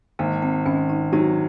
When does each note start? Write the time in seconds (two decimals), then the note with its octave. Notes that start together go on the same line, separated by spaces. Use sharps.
0.19 G#1 A#3
0.42 C4
0.66 G#1 C#4
0.89 D#4
1.12 F#3 D#4